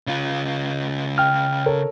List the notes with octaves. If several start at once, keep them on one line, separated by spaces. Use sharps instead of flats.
C#3 F4
G5 F6
A4 A#4 C#5